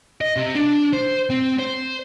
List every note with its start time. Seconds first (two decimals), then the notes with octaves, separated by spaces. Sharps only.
0.21 D#5
0.37 C3
0.55 D4
0.93 C5
1.30 C4
1.59 C5